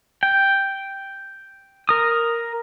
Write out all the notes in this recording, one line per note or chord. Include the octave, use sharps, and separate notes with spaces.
G5
A#4 D#6